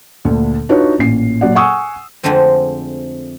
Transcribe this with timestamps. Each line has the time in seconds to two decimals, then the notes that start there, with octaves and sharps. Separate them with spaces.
0.25 D2 A#2 D3
0.69 D4 D#4 F4 F#4 B4 C#5
0.99 A1 A#2 C7
1.41 A#2 F#3 D5 F#5
1.55 F#5 G#5 C#6 D#6 E6
2.23 F2 D3 G#3 A3 C4